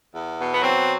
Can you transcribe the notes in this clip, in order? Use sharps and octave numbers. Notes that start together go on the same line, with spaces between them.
E2
B2
B3
F#3 C4